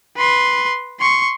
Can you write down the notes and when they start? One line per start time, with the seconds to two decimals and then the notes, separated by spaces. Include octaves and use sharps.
0.17 B4 C6
1.00 C6 C#6